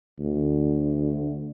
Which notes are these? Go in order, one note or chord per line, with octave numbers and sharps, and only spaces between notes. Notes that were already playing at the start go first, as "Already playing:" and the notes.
D2